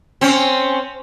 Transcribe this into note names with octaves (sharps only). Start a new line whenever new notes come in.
C4 C#4